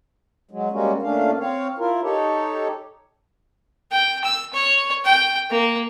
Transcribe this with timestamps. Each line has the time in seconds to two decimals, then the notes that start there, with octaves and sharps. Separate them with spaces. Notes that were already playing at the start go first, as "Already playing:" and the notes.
0.51 F#3 G#3
0.72 G3 G#3 A#3 C#4 F#4
1.02 A#2 A3 C#4 D4 F5
1.40 C4 C#5 F5
1.78 E4 F4 A#4
2.03 D#4 G4 A4 C#5
3.91 G5
4.24 E6
4.53 C#5
5.05 G5
5.50 A#3